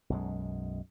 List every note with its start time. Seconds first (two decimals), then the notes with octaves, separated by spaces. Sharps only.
0.10 B1 F#2 G#3